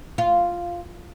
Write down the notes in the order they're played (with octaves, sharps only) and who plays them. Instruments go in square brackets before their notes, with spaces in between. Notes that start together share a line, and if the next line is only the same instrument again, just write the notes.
[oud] F4